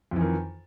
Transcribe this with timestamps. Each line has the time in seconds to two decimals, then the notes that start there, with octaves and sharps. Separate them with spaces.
0.11 F2
0.16 E3
0.21 D#3